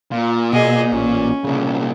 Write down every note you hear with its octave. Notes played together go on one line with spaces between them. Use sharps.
A#2 F4
B2 G#4 D#5
A1 C#4
C2 A#2 C#3